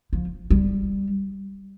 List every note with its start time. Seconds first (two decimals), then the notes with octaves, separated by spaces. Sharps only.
0.13 F3
0.50 G3